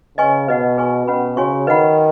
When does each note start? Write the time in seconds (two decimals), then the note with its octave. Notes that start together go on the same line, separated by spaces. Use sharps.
0.18 C#3 B4 D#5 G#5 C#6
0.48 B2 B4 D#5 F#5
0.78 G#4 B4 G#5 C#6
1.07 B2 C#4 B4 F#5 B5
1.37 C#3 F#4 C#5 G#5 C#6
1.67 D#3 B4 D#5 F#5 B5